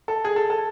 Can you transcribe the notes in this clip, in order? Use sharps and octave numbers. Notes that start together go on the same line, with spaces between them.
A4
G#4
A4
A4